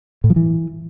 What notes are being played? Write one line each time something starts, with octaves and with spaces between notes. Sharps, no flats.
A2
F3
E3